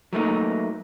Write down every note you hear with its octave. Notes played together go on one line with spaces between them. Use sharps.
F#3 A3 A#3 D#4